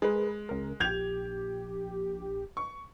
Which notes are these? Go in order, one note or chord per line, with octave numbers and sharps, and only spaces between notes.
G#3 G#4 A#4 B4
C#2 A#4
A#1 G4 G6 G#6 F7
C#6